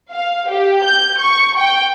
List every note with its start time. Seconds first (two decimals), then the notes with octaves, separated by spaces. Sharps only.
0.12 F5
0.50 G4
0.83 G6
1.20 C#6
1.58 G5